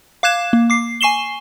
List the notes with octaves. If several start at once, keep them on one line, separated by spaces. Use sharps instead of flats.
F5 D6 F#6 G#6 E7
A#3
D6 C7
G#5 C#6 C7 E7 G7